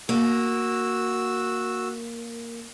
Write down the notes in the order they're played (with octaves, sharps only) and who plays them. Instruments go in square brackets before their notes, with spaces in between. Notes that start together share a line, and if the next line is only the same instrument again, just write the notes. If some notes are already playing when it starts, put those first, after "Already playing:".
[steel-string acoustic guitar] A#3 [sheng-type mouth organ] F#4 E6